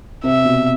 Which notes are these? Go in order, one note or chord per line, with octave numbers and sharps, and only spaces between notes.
C3 E5
B2